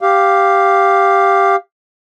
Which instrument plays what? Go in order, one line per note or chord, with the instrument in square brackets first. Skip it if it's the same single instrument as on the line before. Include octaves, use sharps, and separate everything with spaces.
[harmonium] G4 F5